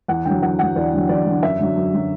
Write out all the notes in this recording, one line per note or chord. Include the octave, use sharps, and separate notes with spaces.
E2 F#5
D3 F#3 G5
E2 F#5
D3 F#3 F#5
E2 D5
D3 F#3
E2 D5
F#3
D3
F#2 E5
D3 F#3
F#2
D3 F#3